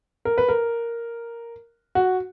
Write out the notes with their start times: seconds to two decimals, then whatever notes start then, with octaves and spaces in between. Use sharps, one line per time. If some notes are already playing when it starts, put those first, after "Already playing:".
0.25 A#4
0.38 B4
0.49 A#4
1.95 F#4